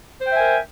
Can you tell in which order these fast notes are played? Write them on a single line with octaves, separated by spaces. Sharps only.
C5 G5 E5 G#5 A#4